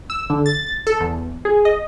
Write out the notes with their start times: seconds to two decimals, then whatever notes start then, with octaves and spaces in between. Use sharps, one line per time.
0.10 E6
0.30 D3
0.46 A6
0.87 A4
1.00 E2
1.45 G#4
1.65 D#5